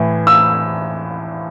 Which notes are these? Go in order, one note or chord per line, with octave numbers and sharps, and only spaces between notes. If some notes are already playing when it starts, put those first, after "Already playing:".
Already playing: A2 E3
E6